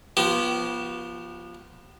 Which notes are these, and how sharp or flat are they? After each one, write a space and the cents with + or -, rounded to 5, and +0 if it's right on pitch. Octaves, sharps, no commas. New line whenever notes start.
F3 -5 B3 -30 G4 -40